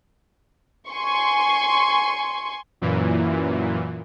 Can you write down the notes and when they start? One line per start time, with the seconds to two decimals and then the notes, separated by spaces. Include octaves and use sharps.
0.89 G#5 C6 C#6
2.81 F#2 A#2 E3